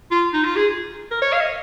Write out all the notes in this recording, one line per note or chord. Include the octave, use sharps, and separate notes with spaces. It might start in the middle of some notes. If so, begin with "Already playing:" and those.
F4
D#4
F4
G#4
A#4
C#5
F5
D#5